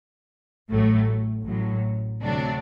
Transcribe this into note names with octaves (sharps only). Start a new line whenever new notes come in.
A1 A2 F#3 A3
A1 A2 F#3
D2 C3 F#3 A3 D4